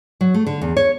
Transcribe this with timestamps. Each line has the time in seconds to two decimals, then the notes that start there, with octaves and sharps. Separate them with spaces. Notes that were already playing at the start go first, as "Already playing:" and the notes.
0.21 F#3
0.34 A3
0.47 D3
0.61 E2
0.77 C#5